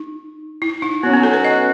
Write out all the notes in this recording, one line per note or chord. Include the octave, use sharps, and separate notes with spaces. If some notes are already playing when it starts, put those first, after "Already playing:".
Already playing: D#4
E4
D#4
F#3 B3 C#4 F#4
B3
A4
B4
D#5